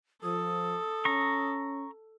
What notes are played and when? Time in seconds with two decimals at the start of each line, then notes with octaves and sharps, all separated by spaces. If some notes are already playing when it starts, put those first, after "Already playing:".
0.24 F3 A4 D#6
1.05 C#4 A#5 C#6